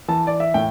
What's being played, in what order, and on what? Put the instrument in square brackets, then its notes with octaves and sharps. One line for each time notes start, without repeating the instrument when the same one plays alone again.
[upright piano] E3 A5
D5
E5
A2 G5